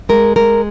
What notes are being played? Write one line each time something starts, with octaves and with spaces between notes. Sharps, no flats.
G#3 A#4
G#3 A#4